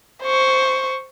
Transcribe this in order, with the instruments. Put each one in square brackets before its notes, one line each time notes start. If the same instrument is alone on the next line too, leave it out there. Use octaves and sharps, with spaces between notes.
[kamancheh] C5 C#6